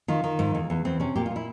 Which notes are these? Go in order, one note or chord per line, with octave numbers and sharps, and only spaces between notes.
D#3 F4
D#3
G#2
E2
E2
E2 C4
C3 C#4
A#2 G4
F4
A#2
E4